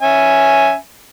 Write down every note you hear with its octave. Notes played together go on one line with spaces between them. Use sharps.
C#4 E5 G#5